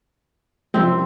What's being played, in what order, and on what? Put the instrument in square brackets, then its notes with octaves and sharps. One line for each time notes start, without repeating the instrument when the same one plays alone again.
[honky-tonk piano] F#1 C2 F2 [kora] C4 E5